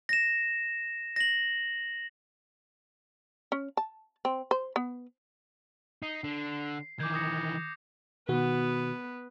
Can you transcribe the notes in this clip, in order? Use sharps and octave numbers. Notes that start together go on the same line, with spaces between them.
A#6 E7
A#6 F#7
C#4
A5
C4
C5
B3
D#4 C7
D3
D#3 E3 D6 G6 G#6
D#6 A#6 C#7
B2 D#3 B3 F#4 B4